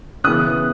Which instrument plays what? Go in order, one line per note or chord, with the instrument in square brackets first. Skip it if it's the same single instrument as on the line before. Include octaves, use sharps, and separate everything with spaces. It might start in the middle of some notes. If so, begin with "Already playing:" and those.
[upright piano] C#3 E3 B3 D#6 F#6